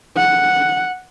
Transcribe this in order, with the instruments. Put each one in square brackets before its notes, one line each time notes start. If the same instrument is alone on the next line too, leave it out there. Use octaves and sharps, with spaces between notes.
[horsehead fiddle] F#5